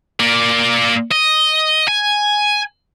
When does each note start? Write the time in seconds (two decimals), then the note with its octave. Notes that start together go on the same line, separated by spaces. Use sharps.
0.20 A#3 D5
1.11 D#5
1.88 G#5